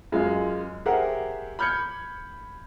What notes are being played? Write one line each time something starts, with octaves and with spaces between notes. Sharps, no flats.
F#2 G#3 F4
G4 G#4 A#4 C5 E5 F#5
B5 F6 G6 G#6 C#7